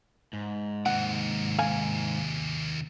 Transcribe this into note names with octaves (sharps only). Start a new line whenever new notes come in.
G#2
D#2 C3 F#5
F5 G#5